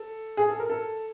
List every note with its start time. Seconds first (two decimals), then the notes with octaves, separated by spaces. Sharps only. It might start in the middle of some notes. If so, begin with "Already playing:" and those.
Already playing: A4
0.37 G#4
0.49 A4
0.60 A#4
0.70 A4